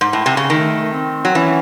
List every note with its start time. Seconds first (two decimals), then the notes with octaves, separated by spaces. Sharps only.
0.01 G#2
0.13 A2
0.26 C3
0.37 C#3
0.50 D#3 A3
0.92 C4
1.25 F#3
1.34 E3 C#4